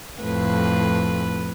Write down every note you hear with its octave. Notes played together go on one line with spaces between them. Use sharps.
F2 A2 B4